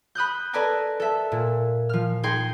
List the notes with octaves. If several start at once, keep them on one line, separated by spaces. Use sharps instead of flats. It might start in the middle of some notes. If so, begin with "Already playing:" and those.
B5 D#6 F#6 G6
A4 B4 D5 D#5 G#5 A#5
A4 E5
A#2
F3 F6
D#4 G#4 G5 G#5 C6